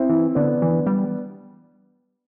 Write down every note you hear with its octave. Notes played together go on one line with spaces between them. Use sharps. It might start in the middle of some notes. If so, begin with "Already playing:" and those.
Already playing: C4 E4
E3
D3 B3 D4
E3
G3